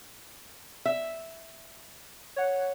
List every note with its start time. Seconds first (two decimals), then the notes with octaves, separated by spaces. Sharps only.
0.86 E5
2.36 C#5 F#5